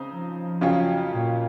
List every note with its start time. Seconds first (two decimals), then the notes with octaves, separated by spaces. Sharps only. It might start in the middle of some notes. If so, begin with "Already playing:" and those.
Already playing: C#3 C4 D#4
0.11 F3
0.61 F2 C#3 F#3 C#4 F4
1.12 A#2